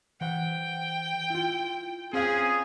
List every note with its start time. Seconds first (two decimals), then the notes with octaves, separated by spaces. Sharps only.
0.21 E3 C5 F#5 G5
1.30 E4 F4
2.13 C4 C#4 F4 G#4 C5 F5